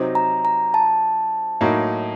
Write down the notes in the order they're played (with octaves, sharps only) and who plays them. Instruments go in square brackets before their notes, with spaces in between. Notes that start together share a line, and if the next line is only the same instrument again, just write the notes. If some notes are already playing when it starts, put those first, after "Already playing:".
Already playing: [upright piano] C3 F#3 C4 D#4
[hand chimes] A#5
A#5
A5
[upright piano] A2 F#3 A#3 D#4